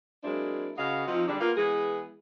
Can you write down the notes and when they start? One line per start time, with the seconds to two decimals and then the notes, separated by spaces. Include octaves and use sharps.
0.24 F#3 G#3 A#3 C4 D4 E4
0.78 C#3 F#4 B4 D#5 F5
1.07 F3 C4 D#4
1.28 D3 G3 G#3 D4
1.41 A#3 B3 F4
1.56 E3 G#3 B3 G#4